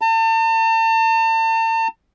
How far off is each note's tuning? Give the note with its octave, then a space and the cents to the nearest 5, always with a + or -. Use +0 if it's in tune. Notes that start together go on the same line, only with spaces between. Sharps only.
A5 +40